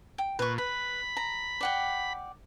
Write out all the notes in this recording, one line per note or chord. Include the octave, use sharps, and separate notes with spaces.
G5
A#2 B4 C#6
B4 B5
A#5
D5 F#5 G5